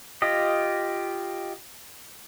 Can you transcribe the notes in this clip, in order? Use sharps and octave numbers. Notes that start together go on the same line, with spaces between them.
F4 G4 D#5